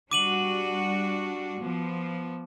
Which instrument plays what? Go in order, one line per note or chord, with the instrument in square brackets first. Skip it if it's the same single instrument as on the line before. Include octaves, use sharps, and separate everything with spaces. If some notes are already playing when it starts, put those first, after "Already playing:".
[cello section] G3 D4 F#4 [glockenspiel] D6 D#7 F#7
[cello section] F3 B3